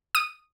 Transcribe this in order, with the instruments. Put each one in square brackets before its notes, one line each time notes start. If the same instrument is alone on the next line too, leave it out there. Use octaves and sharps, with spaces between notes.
[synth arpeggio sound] D#6